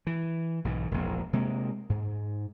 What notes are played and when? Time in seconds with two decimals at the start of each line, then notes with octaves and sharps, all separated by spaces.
0.07 E3
0.65 B1 G#2 E3
0.91 E1 A#1
1.33 C3 G#3 A#3
1.90 G#2